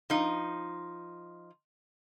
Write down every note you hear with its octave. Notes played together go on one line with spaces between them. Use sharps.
F3 D#4